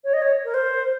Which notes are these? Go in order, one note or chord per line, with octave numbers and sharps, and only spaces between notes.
C#5
D#5
C#5
A#4
C5